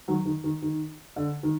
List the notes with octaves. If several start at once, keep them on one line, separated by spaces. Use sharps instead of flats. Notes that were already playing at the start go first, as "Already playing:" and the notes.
D#3 F#3
D#3
D#3
D#3
D3
D#3